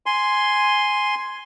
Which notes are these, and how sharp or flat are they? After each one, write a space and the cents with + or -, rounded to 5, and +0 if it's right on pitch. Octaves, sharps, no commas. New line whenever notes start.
G#5 +0 C6 +0